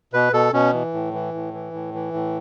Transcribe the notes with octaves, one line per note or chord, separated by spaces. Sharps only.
B2 B4
B2 A4
B2 C#4
E3
A2
E3
A2
E3
A2
E3
A2